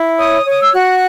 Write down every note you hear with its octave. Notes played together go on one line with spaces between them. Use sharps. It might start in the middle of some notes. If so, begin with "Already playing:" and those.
Already playing: E4
C#5 D#6
C#5 D#6
E6
F#4 F#6